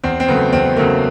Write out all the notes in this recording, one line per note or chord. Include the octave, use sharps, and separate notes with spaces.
E2 C4
C4
C#3 F#3 A3 B3
E2 C4
C#3 F#3 A3 A#3